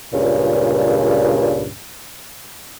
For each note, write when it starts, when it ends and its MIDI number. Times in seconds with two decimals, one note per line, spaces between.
0.13 1.72 37
0.13 1.72 43
0.13 1.72 46
0.13 1.72 49